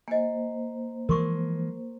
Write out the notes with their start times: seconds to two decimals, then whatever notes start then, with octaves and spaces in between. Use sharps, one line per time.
0.08 A#3 C5 D#5 G#5
1.09 E3 F3 G#3 A#4 C6 C#6